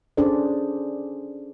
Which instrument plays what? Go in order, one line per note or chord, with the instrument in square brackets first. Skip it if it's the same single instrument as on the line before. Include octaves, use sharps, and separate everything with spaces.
[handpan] C#4 D4 G#4 A4 C5 D5